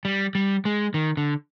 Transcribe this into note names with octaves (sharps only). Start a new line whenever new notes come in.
G3
G3
G#3
D#3
D3